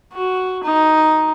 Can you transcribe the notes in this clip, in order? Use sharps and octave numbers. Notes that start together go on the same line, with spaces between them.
F#4
D#4